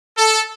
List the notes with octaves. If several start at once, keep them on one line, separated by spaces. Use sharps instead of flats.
A4